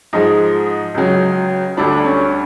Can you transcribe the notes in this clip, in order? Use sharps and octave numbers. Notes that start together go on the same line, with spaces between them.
G#2 F3 G#3 D#4
C#2 C#3 F#3
D2 D3 G3 D4
C#4